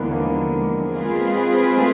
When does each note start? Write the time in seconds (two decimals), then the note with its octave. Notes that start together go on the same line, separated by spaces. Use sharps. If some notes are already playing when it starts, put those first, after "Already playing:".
Already playing: D#2 D3 E3 F3 G#3 A#3 B3
0.11 A#3
0.95 G#3 C4 F4 G#4 B4
1.77 A3